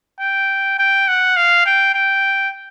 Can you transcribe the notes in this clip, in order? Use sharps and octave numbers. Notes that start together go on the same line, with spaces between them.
G5
G5
F#5
F5
G5
G5